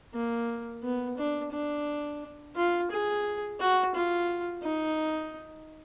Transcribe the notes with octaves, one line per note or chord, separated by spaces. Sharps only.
A#3
B3
D4
D4
F4
G#4
F#4
F4
D#4